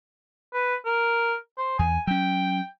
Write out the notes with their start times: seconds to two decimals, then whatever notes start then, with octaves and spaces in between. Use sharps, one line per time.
0.53 B4
0.85 A#4
1.57 C5
1.79 E2 G#5
2.07 F#3 C#4 G5